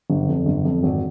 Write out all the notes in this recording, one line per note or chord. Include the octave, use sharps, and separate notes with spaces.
G1
F2
G1
F2
G#1